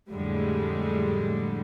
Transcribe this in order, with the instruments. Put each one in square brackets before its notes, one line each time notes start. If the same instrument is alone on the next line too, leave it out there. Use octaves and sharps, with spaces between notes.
[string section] F2 A2 D3 G3 G#3